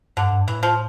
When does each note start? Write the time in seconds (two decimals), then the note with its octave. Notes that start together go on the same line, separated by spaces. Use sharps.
0.17 G2 D3
0.32 G2
0.48 A2 E3
0.63 F3